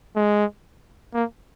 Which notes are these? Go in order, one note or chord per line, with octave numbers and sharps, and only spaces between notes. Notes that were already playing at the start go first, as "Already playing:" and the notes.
G#3
A#3